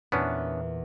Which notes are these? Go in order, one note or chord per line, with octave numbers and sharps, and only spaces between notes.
E2 A#2 B3 C#4 D4